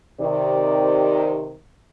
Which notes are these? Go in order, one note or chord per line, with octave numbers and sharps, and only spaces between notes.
C3 D#3 D5